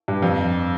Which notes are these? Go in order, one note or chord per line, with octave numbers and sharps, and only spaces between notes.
G2
F2